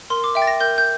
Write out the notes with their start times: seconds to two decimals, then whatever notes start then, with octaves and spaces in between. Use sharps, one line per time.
0.10 A#4 C6
0.24 D6
0.35 E5 G5
0.42 A6
0.47 A#6
0.60 A#4 G6
0.78 G6